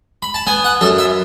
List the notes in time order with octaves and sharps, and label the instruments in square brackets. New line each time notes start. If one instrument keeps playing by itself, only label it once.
[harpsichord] B5
A5
B3 G#5
F#5
F#2 A4
E5